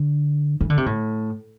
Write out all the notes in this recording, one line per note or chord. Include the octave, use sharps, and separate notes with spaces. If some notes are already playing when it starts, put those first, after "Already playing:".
Already playing: D3
E3
D3
C3
A2